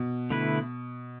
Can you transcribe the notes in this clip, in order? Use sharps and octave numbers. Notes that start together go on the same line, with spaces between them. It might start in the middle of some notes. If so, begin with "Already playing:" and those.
Already playing: B2
D3 A3 E4 B4